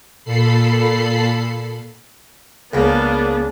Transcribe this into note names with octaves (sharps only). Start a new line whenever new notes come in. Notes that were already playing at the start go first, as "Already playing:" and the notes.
A#2 A4 B5 C7
C#2 C#3 A#3 B3 D4 A#4